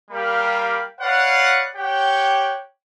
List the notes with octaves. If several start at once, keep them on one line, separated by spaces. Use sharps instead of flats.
G3 A#3 G4 A#4 F5 B5
B4 C#5 D5 F5 F#5
G4 C#5 F#5 G5